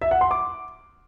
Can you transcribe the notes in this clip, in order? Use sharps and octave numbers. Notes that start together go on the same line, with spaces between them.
E5
F#5
C6
D6